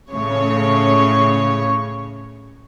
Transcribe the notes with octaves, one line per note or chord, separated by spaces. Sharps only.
A2 C#3 C#5